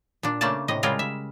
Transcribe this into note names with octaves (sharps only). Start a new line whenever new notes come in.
A#2 D4
C#3 A3 A#3 D4 D5 A5
A2 C3 D#5
C#3 G3 G#3 F4 A#4
E5